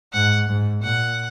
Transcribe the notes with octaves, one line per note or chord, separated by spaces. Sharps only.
G#2 F#5
G#2
A#2 F#5